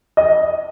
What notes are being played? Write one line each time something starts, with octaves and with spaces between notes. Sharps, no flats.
D#5